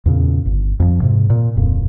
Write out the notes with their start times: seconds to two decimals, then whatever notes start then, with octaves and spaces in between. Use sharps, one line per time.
0.06 E2 A#2 C#3
0.46 G1
0.80 F2 E3 F3
1.02 G#2 C3
1.30 A#2
1.56 D1 F2 A#2